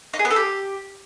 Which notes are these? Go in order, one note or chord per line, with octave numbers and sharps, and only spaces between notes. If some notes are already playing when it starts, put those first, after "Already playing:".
D#4
G#4
B3
A4
G4